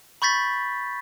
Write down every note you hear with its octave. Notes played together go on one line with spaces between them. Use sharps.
B5 C#6 G6 A6 B6